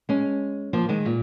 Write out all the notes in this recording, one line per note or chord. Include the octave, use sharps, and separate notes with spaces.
G#3 C#4
F3 A#3
D#3 G#3
A#2